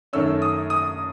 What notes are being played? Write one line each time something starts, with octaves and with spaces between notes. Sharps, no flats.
F#2 D#3 A3 C#4 E6
D#6
D#6